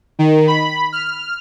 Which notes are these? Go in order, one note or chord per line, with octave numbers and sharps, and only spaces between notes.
D#3
B5
F6